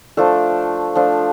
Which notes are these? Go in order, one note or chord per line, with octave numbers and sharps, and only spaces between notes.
F3 A3 D4 A4
F3 A3 D4